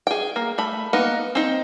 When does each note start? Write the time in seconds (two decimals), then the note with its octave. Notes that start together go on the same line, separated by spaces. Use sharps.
0.07 G#4 G5
0.36 A#3
0.58 A3 B5
0.93 A#3 B3 D#4
1.35 C4 D#4